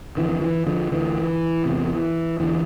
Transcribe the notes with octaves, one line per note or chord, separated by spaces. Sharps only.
F2 D3 E3
E3
D3 F3
D2 D3 E3
E2 C3
E2 D3 E3